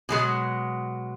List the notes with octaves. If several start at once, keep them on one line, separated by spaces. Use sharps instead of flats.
B2 F#3 G#3